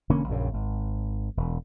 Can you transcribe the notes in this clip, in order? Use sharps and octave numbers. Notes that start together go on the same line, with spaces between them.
E1 D3 A#3 C#4
A#1 F#2 C#3
G#1
E1